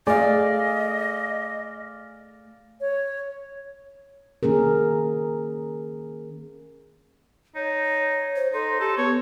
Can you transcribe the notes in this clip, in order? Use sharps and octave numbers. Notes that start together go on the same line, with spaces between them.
A3 G#4 D5 D#5 F5 G#5
C#5
D#3 A#3 C#4 G#4 A#4
D#4 C#5
C5
D#4 A4 C6
G4 A4
B3 B4 C#5